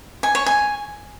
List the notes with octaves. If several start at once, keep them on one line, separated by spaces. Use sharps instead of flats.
G#5
C#5
G#5